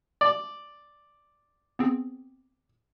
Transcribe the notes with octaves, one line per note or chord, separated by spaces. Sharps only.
D5
B3 C4 G#4